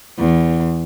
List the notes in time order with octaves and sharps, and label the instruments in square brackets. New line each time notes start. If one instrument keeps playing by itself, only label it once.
[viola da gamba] E2